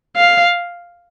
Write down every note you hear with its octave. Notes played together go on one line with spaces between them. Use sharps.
F5